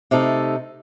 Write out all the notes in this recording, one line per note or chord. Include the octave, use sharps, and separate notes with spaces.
C3 A3 D#4 A4